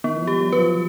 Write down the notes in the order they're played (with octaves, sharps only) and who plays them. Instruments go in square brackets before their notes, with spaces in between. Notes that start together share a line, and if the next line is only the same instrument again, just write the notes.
[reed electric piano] D#3 [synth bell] B3
[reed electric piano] E3
F3
[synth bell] G4
[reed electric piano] G3
F#3
[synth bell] B4
[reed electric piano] F3